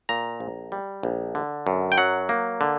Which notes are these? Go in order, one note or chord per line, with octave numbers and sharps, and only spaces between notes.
A#2 A#5
A#1
G3
A#1
D3
F#2
G5
F#3 F#5
A#3
D3